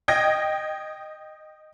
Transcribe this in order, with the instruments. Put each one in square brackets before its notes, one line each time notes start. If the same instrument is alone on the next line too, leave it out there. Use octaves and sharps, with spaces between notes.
[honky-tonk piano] D#5 G5 G#6 A#6